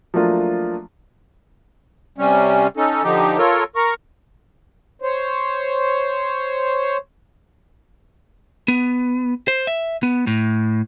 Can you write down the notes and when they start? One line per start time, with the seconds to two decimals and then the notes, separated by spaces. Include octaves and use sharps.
0.14 F3 F#3 A3 A#3 D4 F4
2.18 C3 G3 C#4
2.77 C#4 D#4 A4
3.03 D3 F3 D#4 G4
3.38 F4 A4 A#4 C#5
3.76 A#4 A#5 C#6
5.02 C5 C#5
8.68 B3
9.48 C5
9.67 E5
10.03 B3
10.27 A2